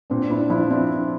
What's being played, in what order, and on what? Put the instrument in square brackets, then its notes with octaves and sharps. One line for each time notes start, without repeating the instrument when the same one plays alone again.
[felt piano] A#2 C4 D4
D4 E4
F3 D4 E4
C4 D4